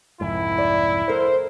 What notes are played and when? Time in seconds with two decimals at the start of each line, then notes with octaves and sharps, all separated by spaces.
0.21 C2 F2 G#2 E4
0.58 D5
1.08 D2 A#4 C5